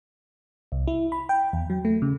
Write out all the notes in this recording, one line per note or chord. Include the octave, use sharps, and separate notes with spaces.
C2
E4
B5
G5
E2
F#3
A3
C#3